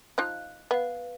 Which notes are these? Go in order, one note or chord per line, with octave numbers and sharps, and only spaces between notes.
F3 D#4 F4 F#6
B3 B4 F5